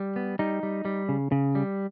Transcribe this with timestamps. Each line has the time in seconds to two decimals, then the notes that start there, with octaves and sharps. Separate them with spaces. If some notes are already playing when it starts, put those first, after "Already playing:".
Already playing: G3
0.16 B3
0.39 G3 D#4
0.63 G3
0.85 G3
1.09 C#3
1.32 C#3
1.55 G3